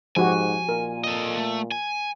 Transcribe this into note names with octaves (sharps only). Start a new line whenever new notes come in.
G#2 F3 F#4 G4 G#5
A#2 A#4
A4 D#5
A3
G#5